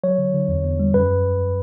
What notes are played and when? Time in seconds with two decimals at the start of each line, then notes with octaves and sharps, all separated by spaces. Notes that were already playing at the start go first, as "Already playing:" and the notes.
0.04 F#3 C#5
0.18 D3
0.34 D3
0.49 E2
0.64 E2
0.80 G3
0.94 F#2 B4